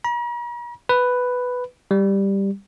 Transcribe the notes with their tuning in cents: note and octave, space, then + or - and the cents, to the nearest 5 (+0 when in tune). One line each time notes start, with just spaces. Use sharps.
A#5 +45
B4 +5
G3 +5